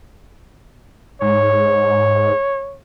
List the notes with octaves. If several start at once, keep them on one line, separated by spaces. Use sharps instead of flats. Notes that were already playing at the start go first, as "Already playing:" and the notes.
G#2 C#5